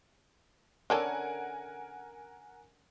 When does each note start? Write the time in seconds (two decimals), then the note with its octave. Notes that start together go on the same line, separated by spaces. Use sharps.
0.90 D3 C#4 A4 A#4 F#5 G#5